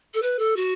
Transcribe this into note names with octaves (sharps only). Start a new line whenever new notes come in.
A4
B4
A4
F#4